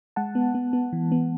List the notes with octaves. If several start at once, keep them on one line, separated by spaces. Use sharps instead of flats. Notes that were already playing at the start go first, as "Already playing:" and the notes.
G#3 F#5 A5
B3
B3
B3
E3
B3